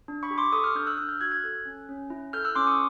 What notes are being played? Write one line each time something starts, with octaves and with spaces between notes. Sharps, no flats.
D4
B5 C#6
G4
C6 D6
A4 C#6 D#6
D#6 F6
D4 F6 G6
E6 F#6
D4 E6 F#6
F6 G6
F#4 F#6 G#6
F#6 G#6
A4
C#4
C#4
E4
A4 F6 G6
E6 F#6
C#4 C6 D6
C#6 D#6